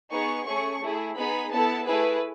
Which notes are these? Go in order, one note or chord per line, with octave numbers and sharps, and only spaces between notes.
B3 D#4 G#4 C#6
A3 C#4 G#4 C#6
A3 E4 G#4
B3 D#4 G#4 B5
B3 E4 A4 A5
A3 E4 G#4 B4